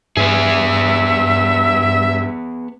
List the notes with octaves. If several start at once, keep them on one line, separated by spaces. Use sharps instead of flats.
G2 B3 G#4 E5